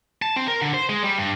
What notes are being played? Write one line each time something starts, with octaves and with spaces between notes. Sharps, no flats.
A5
C4
A#4
D3
C5
G#3
G3
G2